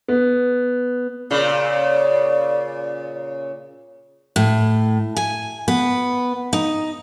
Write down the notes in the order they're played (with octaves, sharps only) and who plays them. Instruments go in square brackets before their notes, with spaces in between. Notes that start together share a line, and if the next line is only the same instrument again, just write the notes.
[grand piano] B3
[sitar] A#2 C#3 [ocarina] D5
[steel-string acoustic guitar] A2
G#5
B3
D#4